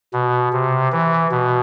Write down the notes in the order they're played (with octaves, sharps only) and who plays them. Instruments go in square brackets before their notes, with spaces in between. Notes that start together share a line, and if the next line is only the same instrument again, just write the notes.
[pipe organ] B2
C3
E3
B2